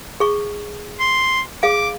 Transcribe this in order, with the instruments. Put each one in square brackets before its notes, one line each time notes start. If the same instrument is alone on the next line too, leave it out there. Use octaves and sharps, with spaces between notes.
[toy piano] G#4 C#6
[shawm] C6
[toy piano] G#4 F5 [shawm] D6